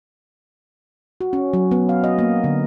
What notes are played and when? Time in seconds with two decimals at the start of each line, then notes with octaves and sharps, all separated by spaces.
1.21 F#4
1.33 C#4
1.53 F#3
1.71 B3
1.89 F5
2.04 D#5
2.19 A#3
2.44 D3